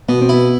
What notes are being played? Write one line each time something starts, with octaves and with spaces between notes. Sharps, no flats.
B2 B3
C4
B3 E4